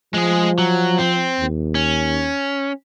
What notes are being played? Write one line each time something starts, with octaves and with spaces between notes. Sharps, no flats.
F3 G#3 G#4
F#3
C4
D#2
C#4